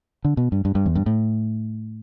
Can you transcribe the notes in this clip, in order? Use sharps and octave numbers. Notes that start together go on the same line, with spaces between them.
D3
B2
G2
G2
G2
E2
G2
A2